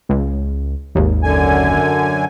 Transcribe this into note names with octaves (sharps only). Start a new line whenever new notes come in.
C#2
G#1 D#2
F#2 D3 G#5